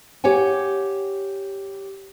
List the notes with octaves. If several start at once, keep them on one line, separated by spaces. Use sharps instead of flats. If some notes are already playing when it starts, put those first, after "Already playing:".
G4 C#5 F#5 G#5